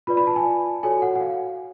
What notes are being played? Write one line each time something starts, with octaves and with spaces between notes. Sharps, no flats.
F4 B4 D5 B5
B5
A5
G#5
F#4 A4 C#5 G#5
F#5
F#5
F5